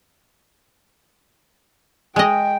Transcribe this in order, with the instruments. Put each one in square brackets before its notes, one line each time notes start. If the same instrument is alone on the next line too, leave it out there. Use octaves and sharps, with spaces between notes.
[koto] G#3 D#5 [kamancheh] G5